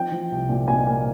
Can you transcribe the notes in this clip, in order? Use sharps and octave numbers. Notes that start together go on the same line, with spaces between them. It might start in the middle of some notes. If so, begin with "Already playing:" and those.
Already playing: F3 G5
F3
C2
A#2
A#2 G#5
A#3